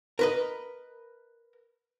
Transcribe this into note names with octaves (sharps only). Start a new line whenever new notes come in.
A#4 B4 D#5